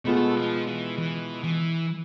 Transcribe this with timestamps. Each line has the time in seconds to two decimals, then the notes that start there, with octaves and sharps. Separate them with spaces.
0.05 B2 G#3 A3 B3 F4
0.35 F3
0.67 E3
0.98 E3
1.44 E3